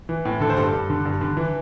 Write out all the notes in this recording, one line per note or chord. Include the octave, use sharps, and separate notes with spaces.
E3
A2
D3 A4
C5
G2 A4
G2
D3
G2
D3
E3